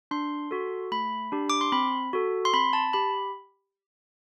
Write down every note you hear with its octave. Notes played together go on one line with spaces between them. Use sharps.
D4 C6
F#4 A4
A3 B5
D4 G4
D6
C6
C4 B5
F#4 A4
C6
C4 B5
A5
G4 B5